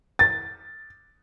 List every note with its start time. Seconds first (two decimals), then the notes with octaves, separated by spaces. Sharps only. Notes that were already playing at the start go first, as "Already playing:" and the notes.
0.19 A6